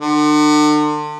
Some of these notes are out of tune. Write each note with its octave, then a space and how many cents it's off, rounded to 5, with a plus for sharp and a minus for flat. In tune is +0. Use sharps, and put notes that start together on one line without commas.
D3 +35